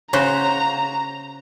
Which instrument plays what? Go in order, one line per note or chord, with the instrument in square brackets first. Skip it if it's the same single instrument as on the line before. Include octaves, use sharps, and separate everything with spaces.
[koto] C#3 F#4 C5 [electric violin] A#5